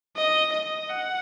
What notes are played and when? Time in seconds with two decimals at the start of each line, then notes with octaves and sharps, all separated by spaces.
0.17 D#5
0.53 D#5
0.89 F#5